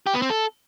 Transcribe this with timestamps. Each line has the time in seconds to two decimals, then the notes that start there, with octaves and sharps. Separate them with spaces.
0.07 G4
0.14 B3
0.22 C4
0.30 A4